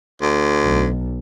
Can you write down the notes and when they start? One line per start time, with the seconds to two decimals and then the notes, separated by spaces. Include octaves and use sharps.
0.21 D2
0.63 B1